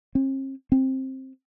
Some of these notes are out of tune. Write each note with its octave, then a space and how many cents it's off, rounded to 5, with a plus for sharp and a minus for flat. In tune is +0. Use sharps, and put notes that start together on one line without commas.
C4 +45
C4 +15